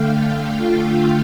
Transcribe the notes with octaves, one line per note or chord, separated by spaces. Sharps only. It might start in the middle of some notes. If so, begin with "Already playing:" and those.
Already playing: D3 A3 F5 G5
F4